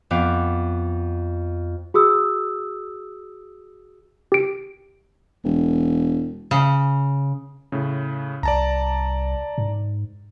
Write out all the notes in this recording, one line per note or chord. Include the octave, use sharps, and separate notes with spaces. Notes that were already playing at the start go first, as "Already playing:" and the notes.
F2 B3 F5 D6
F#4 G#4 D#6 E6
G4 D7
E1
C#3
A2 C#3
C2 D5 A5 A#5
G#2